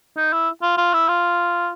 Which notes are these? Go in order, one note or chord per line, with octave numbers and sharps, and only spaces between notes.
D#4
E4
F4
F4
E4
F4